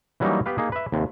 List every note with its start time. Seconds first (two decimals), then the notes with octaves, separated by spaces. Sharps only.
0.20 E3 F#3 G3 A#3 C#4 D#4
0.46 B3 G4 B4 F5
0.58 A#3 D#4 G#4
0.72 B4 E5
0.92 D#2 C3